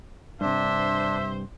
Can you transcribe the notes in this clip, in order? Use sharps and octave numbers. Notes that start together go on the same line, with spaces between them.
G2 C3 D4 C5 E5